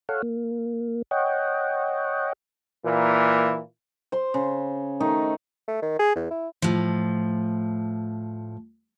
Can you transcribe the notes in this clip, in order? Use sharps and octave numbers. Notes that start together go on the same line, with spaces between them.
A4 C#5 F5 F#5
A#3
C#5 D#5 F#5 G5
A#2 E3 A#3
C5 C6
C#3
D#3 A3 D#4
A3
D#3
G#4
E2
E4
A2 F3